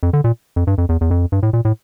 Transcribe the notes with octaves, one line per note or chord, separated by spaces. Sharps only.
F2
D3
A#2
F2
G2
F2
E2
E2
F2
G2
A2
A#2
A2